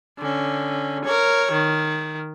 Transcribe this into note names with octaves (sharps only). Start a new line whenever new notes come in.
D3 C#4
A#4 C#5
D#3